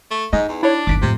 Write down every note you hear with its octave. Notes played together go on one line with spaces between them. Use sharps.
A3
G#2 D#4 D#5
E2
D4 E4 C#5
G1 D#2 D6 B6 D7
F2 A2 C3